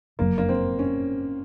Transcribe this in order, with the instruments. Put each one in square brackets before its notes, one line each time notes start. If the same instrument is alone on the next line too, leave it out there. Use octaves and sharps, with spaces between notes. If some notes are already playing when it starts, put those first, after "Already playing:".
[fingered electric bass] F#1 F2 C3 F#3 [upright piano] A#3
[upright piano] A#3
C4
C#4